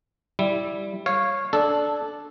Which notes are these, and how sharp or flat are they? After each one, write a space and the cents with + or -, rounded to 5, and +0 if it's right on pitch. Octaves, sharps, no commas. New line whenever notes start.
G3 +0 E4 +0
C#5 -15 F5 +0
D4 +0 A4 -10